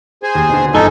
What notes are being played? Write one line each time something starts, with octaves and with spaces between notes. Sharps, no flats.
G#4 C5 G#5
D#2
B2 D3
G1 D#4 A4 G#5 G7